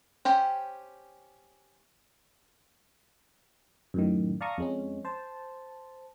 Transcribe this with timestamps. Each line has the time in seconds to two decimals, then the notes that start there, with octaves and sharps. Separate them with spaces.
0.25 C#4 G4 C5 G5
3.94 F#2 A2 D#3
4.41 D5 F5 A5 A#5 C#6 D#6
4.58 F2 G#3 C#4
5.05 C5 A5